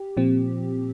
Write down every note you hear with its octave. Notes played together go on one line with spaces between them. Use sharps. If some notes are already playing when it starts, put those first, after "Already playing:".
Already playing: G4
A#2 F3 C4